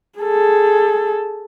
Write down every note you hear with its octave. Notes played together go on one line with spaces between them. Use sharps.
G#4 A4